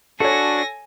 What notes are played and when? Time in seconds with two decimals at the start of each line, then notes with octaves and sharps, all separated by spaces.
0.20 D4 F#4 A4 C#5 G#5 A#6